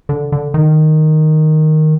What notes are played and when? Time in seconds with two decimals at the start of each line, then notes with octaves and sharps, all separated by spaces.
0.09 D3
0.32 D3
0.54 D#3